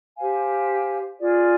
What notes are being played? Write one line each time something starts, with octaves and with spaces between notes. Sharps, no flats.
G4 C5 F5 G#5
F4 G#4 D5